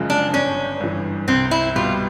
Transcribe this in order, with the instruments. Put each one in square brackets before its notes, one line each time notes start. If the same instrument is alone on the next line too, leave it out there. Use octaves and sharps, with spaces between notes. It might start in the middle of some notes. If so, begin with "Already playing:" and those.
Already playing: [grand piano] F#1 F#2 C#3 F3 G#3
[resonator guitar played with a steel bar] D4
[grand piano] G1 [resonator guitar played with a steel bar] C#4
[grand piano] G2 E3
[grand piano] C2 [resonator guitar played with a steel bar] C4
[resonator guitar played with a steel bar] E4
[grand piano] B2 G3 [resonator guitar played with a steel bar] F4